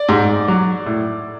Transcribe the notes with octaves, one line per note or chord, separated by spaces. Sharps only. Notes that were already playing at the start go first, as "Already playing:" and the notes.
Already playing: D5
G#2
F#3
A2